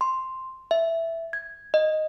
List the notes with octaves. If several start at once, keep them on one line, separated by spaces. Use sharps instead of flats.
C6
E5
G#6
D#5